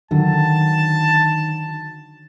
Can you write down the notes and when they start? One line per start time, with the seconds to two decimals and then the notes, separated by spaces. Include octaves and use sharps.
0.11 D3 D#3 F#3 A5